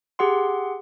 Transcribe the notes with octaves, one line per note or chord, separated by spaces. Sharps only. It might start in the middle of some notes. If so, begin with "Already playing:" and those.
G4 G#4 F#5 C6